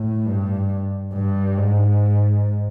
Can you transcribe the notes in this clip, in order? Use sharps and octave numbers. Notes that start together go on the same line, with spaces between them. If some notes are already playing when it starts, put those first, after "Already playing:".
Already playing: A2
G2
G2
G#2